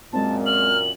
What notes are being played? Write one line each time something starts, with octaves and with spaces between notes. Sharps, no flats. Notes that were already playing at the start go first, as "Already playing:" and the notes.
F#2 A#2 G#3 C4 A5
F6 F#7